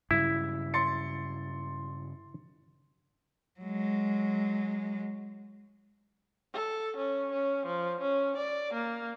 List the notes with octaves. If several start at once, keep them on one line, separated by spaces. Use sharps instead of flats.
G2 C#3 F#3 E4
C6 A6 C#7
F#3 G#3
A4
C#4
C#4
F3
C#4
D5
A#3